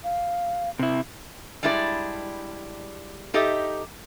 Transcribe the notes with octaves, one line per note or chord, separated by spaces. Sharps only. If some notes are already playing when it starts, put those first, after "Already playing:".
F5
C3 E4
G3 G#3 D4 E4 G#4 D5
D#4 G4 A4 D#5 E5